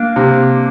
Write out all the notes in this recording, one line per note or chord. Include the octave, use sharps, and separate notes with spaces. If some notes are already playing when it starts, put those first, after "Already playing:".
Already playing: A#3 D4
C3